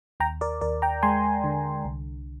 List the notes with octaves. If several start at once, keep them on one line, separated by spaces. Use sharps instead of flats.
D#2 G5 A#5
A#4 D5
D#2 A#4 D5
G5 A#5
G#3 G#5 C6
D3
C2